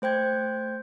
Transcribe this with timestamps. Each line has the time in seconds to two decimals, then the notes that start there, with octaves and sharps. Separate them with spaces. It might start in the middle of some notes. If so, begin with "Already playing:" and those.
0.02 A3 C5 G5 G6 G#6